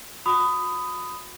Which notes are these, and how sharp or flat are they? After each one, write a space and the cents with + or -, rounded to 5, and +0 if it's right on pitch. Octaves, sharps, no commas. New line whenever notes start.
F#4 -40 B5 +25 D#6 +0